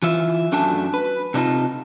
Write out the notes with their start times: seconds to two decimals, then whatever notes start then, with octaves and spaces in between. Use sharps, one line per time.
0.02 E3 F4 E5
0.52 F#2 A3 D4 F#4 G#5 A5
0.94 B4
1.34 C3 D4 D#4 F4 A5